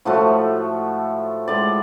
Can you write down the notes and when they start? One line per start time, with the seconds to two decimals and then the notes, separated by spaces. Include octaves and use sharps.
0.05 A2 F3 A3 F#4
1.48 A2 G#3 D5